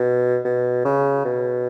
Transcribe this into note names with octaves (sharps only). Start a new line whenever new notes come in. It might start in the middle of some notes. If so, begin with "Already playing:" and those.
Already playing: B2
B2
C#3
B2